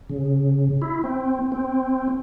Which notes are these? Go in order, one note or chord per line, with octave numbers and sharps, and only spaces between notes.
C#3
E4
C4
C4